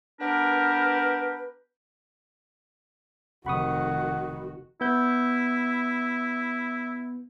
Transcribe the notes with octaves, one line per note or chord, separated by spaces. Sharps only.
B3 D4 G4 A#4 B4
F1 D#3 F#4 F#5 B5 C#6 D#6
B3 E4 G6